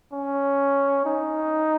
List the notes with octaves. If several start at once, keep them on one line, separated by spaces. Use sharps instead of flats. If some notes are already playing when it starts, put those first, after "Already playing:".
C#4
D#4